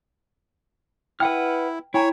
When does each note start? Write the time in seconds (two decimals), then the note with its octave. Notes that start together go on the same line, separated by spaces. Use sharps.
1.20 E4 B4 F#5 G5 F6
1.94 E4 C#5 G5 G#5 A#5